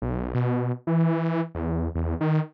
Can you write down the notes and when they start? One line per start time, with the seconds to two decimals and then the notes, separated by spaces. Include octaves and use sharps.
0.02 B1
0.35 B2
0.87 E3
1.55 E2
1.95 E2
2.21 D#3